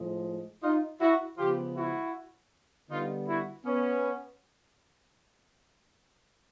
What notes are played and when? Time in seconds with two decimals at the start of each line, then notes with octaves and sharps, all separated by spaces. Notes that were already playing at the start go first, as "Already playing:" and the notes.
Already playing: A2 F3 G#3
0.62 D#4 F4
1.00 E4 F#4
1.38 C#3 F3 G#3 B3 F4 G4
1.76 E4 F#4
2.89 D3 G3 B3 D#4 F4
3.27 E4 F#4
3.64 B3 C#4